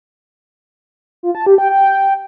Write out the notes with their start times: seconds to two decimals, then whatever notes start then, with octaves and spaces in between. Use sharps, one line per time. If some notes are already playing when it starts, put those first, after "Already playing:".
1.23 F4
1.35 A5
1.46 G4
1.58 G5
1.70 G5